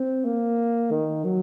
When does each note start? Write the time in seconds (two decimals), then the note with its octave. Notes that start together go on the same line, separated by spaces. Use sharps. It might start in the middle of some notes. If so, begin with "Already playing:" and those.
Already playing: C4
0.25 A#3
0.91 D#3
1.24 F#3